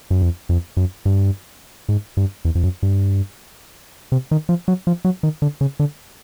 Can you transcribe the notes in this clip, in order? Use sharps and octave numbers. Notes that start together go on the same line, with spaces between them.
F#2
F2
F2
F#2
G2
G#2
G2
E2
F2
F#2
G2
C3
D#3
F3
F#3
F3
F#3
D#3
D3
C#3
D3